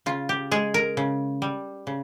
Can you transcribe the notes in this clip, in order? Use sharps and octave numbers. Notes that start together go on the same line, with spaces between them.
C#3 F4
G4
G#3 G#4
A#4
C#3
G3
C#3